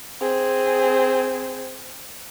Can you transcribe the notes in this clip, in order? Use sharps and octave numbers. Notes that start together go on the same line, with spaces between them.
C4 G#4